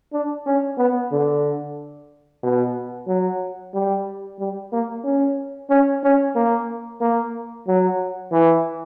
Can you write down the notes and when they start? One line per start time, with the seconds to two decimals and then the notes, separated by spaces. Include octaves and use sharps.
0.13 D4
0.46 C#4
0.78 B3
1.12 D3
2.43 B2
3.08 F#3
3.74 G3
4.40 G3
4.72 A#3
5.04 C#4
5.70 C#4
6.04 C#4
6.36 A#3
7.01 A#3
7.68 F#3
8.32 E3